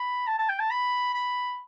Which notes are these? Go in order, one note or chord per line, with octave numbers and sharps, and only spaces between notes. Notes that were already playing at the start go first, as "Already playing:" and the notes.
Already playing: B5
A5
A5
G5
A5
B5
B5